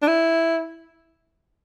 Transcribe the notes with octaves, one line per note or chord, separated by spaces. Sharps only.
D4
E4